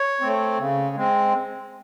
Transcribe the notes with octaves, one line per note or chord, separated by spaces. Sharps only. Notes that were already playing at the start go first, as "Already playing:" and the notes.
Already playing: C#5
A3 C4
C#3
G#3 C4